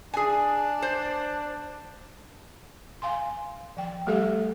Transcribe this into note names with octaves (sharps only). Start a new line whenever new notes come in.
D4 G#4 G#5
C5
F5 G#5 C6
F3 G5
G3 A3 G4 A4 E5